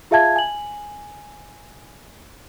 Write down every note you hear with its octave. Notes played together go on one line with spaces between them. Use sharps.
F4 G#4 E5 F5 A5 G#6
G#5 F#7